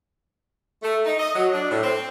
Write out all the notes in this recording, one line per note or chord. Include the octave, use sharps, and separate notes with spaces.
A3
D#4
D#5
F#3
D4
A2
C4